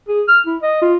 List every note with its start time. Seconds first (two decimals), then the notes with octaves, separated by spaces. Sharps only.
0.08 G#4
0.28 F6
0.46 E4
0.62 D#5
0.82 F4